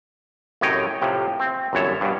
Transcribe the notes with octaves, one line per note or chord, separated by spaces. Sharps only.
F#2 A2 C3 C#5 D#5 G5
A2 C3 F3
C4
G1 F#2 E3 C#5 A5
G2 B2